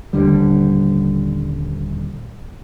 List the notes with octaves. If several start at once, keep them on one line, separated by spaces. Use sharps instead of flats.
D#1 A#1 D3 G3